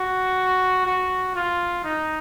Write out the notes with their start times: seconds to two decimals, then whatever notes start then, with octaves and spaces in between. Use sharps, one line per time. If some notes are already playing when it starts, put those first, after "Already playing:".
Already playing: F#4
0.86 F#4
1.35 F4
1.84 D#4